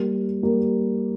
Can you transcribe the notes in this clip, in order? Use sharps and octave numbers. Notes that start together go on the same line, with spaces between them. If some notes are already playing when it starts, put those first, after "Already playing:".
Already playing: G3 A#3
G3 A#3